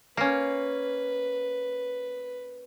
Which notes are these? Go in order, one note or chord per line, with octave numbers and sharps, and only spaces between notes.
A#3 C#4 B4